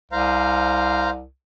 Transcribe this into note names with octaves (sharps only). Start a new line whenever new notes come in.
C2 C5 F5 A#5